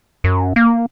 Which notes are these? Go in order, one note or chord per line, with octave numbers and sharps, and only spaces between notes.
F#2
A#3